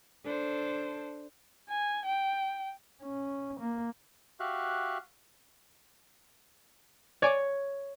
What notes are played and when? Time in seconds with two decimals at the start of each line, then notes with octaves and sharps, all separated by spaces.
0.25 D4 A4 C5
1.69 G#5
2.05 G5
3.02 C#4
3.60 A#3
4.40 F#4 G4 E5 F5 F#6
7.22 C#5 D5 G#5 D6